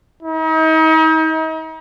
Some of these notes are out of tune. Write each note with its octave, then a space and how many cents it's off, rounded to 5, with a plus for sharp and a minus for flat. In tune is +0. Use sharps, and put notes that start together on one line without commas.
D#4 +40